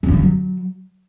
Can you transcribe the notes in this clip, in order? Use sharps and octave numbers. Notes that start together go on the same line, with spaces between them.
E3
G2
E3
F#3